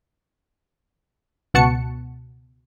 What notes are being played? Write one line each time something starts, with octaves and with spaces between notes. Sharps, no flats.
C#2 B2 F#5 A5 C#6 C#7